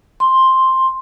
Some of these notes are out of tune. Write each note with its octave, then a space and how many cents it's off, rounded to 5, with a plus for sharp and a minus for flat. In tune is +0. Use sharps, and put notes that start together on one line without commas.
C6 +5